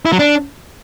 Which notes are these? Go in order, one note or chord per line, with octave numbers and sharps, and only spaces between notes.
E4
F#3
D4